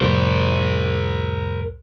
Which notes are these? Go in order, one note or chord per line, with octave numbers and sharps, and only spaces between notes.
C2 F2 A2 A#4 C5